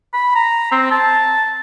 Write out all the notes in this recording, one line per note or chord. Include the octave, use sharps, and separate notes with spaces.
B5
A#5
C4
A5